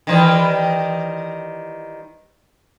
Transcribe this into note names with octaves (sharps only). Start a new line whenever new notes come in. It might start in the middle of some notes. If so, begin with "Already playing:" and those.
D#3 E3 G3